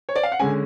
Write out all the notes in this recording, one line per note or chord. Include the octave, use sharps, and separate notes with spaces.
C#5
D5
F5
F#5
D3 G#3 C#4 G#5